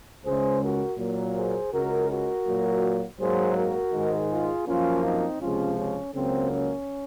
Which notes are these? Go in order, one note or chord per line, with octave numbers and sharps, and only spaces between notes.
C#2 C#3 G#3 G#4 C5
F#4 A#4
A#2 F#3 A#3
G#4 C5
C#2 C#3 G#3 F#4 A#4
F#4 A#4
A#2 F#3 A#3
G#2 F#3 A#3 G#4 C5
F#4 A#4
G#2 D#3 G#3
F4 G#4
F#2 F3 A#3 C#4 F4
C4 D#4
C#2 C3 F3 G#3 C#4 F4
C#4
C#2 C#3 F#3 A#3 C4
C#4